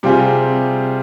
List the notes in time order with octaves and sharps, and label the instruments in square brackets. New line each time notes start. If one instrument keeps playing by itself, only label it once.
[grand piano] C3 G3 C4 F4 G#4